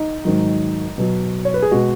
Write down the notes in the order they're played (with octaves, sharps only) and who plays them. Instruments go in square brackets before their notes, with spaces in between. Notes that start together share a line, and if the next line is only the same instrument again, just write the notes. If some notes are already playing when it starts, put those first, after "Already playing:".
Already playing: [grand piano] D#4
G#2 D#3 F#3
B2 F#3
C#5
B4
G#4
B2 G#3 F#4